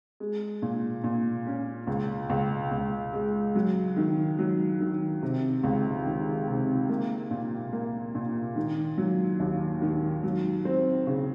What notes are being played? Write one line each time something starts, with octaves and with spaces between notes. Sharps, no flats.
G#3
A#2
A#2
C#4
C#2
C#2
C#2
G#3
F#3
D#3
F#3
D#3
C3
C#2
D#3
C3
A#3
A#2
A#3
A#2
D#3
F#3
D#2
D#3
F#3
C4
C#3